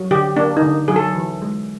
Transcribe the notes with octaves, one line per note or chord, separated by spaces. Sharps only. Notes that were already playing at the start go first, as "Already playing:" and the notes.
Already playing: F#3
D3 G4
A#3 D4
D#4
D3
F#3 G#4
A4
E3
G#3